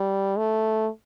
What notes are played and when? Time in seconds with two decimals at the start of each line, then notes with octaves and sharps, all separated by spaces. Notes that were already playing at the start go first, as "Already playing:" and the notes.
Already playing: G3
0.38 A3